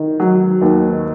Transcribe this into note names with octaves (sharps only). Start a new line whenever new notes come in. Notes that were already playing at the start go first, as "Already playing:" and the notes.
Already playing: D#3
F#3
D#2